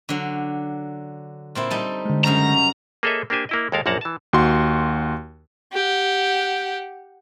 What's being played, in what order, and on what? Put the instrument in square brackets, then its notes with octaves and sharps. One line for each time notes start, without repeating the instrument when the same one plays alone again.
[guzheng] D3 F#3
A#2 C4 E4
G3 D#4 A4
[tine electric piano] D3 G#3
[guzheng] F#2 C#3 G3 [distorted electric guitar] A#5
[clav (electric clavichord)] A#3 G#4 A4 C#5 D#5 E5
A#3 D4 G4 C5 G#5
A#3 E4 D#5
D#2 G#3 A4 A#4 F5
A#1 F#2 A#3 F#5 A5 A#5
E3 A5
[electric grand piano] D#2 F#4 C6
[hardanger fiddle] G4 F#5